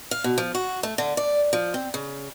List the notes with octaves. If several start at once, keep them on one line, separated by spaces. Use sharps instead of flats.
F5
B2
F3
F#4
A3
D3
D5
F3
C4
C#3